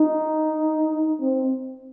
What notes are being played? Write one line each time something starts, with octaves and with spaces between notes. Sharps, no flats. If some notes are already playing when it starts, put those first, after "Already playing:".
Already playing: D#4
C4